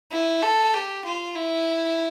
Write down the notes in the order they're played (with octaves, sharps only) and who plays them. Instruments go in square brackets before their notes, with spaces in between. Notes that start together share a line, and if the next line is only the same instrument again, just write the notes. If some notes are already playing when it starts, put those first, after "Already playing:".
[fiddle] E4
A4
G4
F4
E4